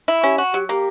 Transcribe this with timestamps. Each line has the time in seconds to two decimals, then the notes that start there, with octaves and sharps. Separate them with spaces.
0.08 E4
0.23 C#4 G4
0.38 F#4
0.53 F#3 G4
0.69 A#3 G4